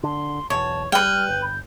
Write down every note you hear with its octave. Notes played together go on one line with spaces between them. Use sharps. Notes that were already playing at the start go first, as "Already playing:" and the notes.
D3 C6
B1 E2 C#5 A5
G3 B4 G5 F6
G1 G6